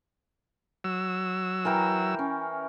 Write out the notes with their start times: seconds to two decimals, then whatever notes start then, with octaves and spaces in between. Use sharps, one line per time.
0.84 F#3 E6
1.65 E3 A#4 G5
2.19 C#4